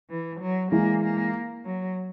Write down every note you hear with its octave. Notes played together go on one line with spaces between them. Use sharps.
E3
F#3
E3 G#3 A#3
A#3
F#3